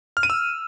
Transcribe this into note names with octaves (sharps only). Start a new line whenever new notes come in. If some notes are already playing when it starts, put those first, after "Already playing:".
F6
D#7
E6